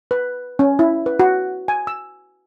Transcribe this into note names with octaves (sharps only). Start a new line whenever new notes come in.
B4
C#4
E4
B4
F#4
G#5
E6